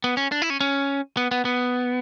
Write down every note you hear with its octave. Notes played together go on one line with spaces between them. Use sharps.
B3
C#4
D4
E4
C#4
C#4
B3
B3
B3